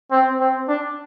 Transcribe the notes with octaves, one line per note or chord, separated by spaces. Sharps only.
C4
C4
D4